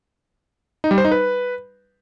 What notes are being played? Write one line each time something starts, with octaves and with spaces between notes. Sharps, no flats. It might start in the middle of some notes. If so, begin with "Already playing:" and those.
D#4
G3
C5
D#4
B4